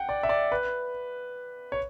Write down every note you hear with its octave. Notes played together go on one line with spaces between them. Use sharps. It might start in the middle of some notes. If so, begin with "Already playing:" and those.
Already playing: F#5 G5
D5
E5
D5
B4
C#5